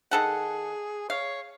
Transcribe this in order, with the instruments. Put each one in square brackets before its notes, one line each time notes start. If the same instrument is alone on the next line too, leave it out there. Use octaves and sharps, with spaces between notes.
[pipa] D#3 A4 F#5 [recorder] G#4
[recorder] C#5 [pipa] F5